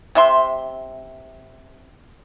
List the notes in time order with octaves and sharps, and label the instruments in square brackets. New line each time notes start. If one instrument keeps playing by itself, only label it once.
[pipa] C3 E5 C6